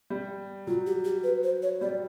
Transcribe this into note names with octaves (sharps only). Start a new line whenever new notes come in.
G3
F#3 F4
G4
G4
B4
C5
C#5
G3 D5